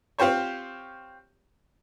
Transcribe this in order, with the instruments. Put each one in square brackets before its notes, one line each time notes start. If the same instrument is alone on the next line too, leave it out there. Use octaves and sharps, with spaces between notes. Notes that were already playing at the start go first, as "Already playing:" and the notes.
[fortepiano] C4 F4 G4 C5 C#5